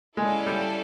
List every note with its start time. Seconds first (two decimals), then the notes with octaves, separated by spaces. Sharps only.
0.17 G#3 C#4 E4 A4 D5 F5
0.46 G3